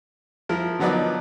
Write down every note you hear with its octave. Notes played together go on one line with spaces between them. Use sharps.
F3 E4 A#4
D3 F3 F#3 B3 D#4 D5